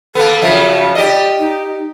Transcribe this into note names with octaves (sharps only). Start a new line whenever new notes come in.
A#3 B3 A4
F#2 C#3 F3 E5
G4 D5 D#5
D#4